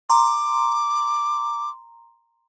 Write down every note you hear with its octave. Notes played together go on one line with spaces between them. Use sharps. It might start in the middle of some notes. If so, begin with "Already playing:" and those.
A#5 C6 D6